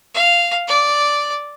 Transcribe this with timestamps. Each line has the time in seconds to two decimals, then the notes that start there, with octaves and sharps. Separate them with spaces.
0.14 F5
0.68 D5